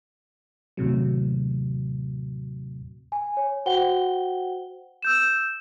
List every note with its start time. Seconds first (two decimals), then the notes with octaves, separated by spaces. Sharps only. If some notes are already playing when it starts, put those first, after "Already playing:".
0.77 D#2 A2 C3 F#3
3.12 G#5
3.37 C#5
3.66 F#4 C5 F#5 G5 G7
5.02 E6 G6 E7